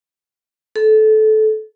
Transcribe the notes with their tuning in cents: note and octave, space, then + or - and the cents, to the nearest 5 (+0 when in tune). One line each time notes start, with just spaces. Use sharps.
A4 -20